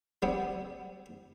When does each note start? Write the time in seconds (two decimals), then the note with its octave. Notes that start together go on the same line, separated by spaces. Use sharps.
0.22 G3 B3 C4